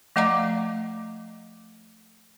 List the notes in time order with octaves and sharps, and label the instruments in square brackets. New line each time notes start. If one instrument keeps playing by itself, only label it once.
[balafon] F3 A3 D#5 F5 A#5 D6